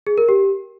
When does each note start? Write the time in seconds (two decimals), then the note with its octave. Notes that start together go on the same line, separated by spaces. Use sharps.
0.07 G#4
0.18 A#4
0.29 G4